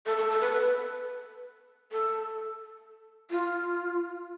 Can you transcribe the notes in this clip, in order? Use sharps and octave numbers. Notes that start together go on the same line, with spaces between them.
A4
A4
A4
B4
B4
A4
F4